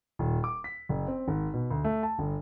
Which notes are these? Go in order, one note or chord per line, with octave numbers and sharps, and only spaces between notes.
D#1
D6
B6
F#1
C4
G#1
B2
D2
A3
A5
G1